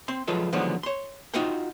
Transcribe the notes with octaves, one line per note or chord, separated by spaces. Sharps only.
C4 C6
F3 F#3 G#3 F4 A4 B4
D3 D#3 F3 F#3 G#3 B3
C#5 C6
D#4 F4 F#4 C5 F#5 G5